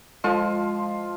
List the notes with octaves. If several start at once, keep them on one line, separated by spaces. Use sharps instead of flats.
F3 G#3 F4 D#5 C6